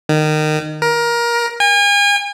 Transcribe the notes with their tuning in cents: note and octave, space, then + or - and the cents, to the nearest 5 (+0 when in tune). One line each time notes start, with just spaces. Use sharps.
D#3 -20
A#4 +20
G#5 -40